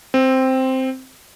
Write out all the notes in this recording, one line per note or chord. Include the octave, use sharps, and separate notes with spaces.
C4